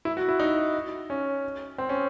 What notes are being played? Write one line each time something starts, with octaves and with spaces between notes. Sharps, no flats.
E4
F#4
E4
D#4
C#4
C4
C#4